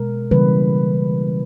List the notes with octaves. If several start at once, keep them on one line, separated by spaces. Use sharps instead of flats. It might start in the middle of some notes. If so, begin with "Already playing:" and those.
Already playing: B2 G#3 A#4
C#3 E3 G3 A#3 B4